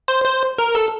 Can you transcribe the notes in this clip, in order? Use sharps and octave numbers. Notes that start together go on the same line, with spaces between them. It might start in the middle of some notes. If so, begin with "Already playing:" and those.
C5
C5
A#4
A4